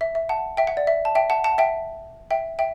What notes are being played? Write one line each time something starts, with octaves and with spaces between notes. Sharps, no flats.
E5
E5
F#5 A5
E5 G5
F#5
D5
E5
A5
E5 G5
F#5 A5
F#5 A5
E5 G5
E5 G5
E5 G5